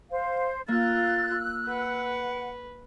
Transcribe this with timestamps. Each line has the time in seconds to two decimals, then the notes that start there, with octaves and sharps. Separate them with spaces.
0.11 C5 F5
0.68 A#3 F4 E6 F#6 A6
1.68 B4 F#5